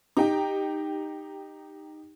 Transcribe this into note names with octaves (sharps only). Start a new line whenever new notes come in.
D#4 G4 G5